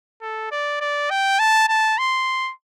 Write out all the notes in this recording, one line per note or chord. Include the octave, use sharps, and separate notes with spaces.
A4
D5
D5
G5
A5
A5
C6